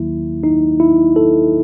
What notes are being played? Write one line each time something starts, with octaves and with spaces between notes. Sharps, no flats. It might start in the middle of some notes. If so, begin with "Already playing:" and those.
Already playing: D#2 D#3 F#3 A#3 E4
D#4
E4
A4